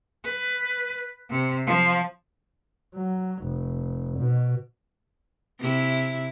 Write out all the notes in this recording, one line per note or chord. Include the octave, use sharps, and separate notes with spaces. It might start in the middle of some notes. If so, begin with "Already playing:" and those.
B4
C3
F3
F#3
F1
B2
C3 E4